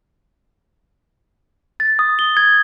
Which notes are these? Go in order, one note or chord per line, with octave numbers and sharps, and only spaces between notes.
A6
D#6
G7
G#6